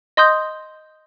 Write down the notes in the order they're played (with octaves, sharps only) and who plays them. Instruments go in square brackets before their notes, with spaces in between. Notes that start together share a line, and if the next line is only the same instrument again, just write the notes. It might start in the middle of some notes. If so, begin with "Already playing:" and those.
[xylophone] D#5 C6 D#6 G6